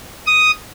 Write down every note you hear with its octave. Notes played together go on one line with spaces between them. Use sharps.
D#6